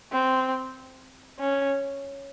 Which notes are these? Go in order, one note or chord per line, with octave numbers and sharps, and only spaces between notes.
C4
C#4